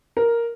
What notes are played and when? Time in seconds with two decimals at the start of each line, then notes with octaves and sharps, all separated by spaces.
0.17 A#4